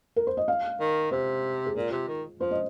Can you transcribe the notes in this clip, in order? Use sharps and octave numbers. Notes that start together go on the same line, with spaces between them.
A#4
C5
D#5
F5
D#3
C3 C5
G#4
A#2 F4
C3
D#3
F3 C5
D#5